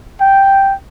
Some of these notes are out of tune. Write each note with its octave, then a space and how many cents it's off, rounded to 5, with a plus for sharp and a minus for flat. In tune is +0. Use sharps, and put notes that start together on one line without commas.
G5 +0